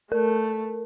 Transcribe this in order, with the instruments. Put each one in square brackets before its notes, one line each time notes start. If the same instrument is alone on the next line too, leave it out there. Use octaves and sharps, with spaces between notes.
[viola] A3 [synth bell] A#4